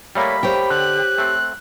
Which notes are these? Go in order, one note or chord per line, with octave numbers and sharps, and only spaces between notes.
G3 A3 A#3 C#5 B5
G4 C5 C#5 G5
D3 F#6
A3 C4